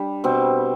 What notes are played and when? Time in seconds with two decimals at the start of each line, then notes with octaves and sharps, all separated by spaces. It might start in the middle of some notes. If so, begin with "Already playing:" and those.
Already playing: G3 D4
0.24 B2 C4